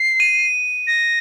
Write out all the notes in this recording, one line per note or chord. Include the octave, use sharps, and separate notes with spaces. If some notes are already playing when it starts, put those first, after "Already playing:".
Already playing: C7
D#7
A#6